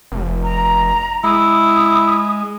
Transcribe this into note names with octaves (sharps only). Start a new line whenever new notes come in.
F1
A#5
G#3 E4 D#6